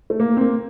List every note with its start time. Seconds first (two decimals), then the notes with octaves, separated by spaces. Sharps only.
0.10 A3
0.20 A#3
0.37 C4
0.41 A#3